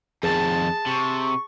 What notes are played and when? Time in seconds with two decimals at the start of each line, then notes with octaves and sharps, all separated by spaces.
0.23 F2 D#3 G#4 A5 A6
0.87 C3 C#6